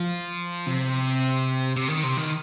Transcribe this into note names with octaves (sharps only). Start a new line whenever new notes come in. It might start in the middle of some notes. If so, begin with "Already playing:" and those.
Already playing: F3
C3
C3
D#3
C3
D#3